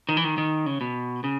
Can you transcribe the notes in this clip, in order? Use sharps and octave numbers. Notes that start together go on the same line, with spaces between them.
D#3
E3
D#3
D#3
C#3
B2
C#3